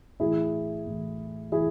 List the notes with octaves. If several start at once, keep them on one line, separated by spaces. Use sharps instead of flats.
A2 E3 E4 G#4
A2 E3
E3 E4 G#4